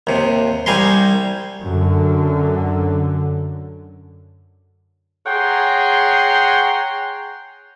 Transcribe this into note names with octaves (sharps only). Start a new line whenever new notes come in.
D#2 C3
C2 G3 G#5 A#5 C6
F#2 D3
G#4 C#5 F#5 G5 A#5 C6